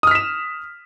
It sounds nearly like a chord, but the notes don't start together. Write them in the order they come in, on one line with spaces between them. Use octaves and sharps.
D#6 F6 B6 E7